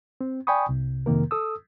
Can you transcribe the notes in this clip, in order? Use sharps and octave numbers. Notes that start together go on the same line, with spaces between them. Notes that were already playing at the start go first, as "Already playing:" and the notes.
C4
D5 G5 G#5 B5 C#6 D#6
C2 C3
F2 C3 D#3 A#3 A#4
A4 D#6 E6